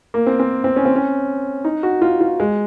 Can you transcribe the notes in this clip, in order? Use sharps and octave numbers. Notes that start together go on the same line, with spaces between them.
A#3
C4
C4
C4
C#4
C4
C#4
D#4
F#4
F4
F4
G#3